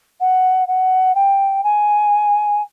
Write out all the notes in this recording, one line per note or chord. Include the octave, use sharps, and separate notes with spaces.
F#5
F#5
G5
G#5